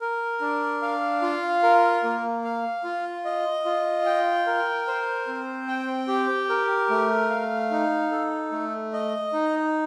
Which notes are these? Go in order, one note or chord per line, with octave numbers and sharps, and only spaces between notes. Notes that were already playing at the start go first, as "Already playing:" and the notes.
A#4
D4
F5
F4
A#4
A#3
F5
F4
D#5
F4
G5
A#4
C5
C4
G5
G4
A#4
A3
F5
D#4
A4
A3
D#5
D#4